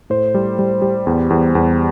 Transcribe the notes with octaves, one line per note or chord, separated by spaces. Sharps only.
A2 C5
G3
G3
G3
E2
E2
E2